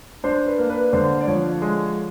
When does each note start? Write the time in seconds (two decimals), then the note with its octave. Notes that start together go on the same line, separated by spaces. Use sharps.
0.24 D4 C5
0.47 B4
0.58 A#3
0.70 B4
0.93 D3 C5
1.21 D5
1.27 F3 C#5
1.62 G#3